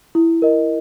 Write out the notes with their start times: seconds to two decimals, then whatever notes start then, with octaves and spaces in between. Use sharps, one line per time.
0.15 E4
0.42 A#4 D#5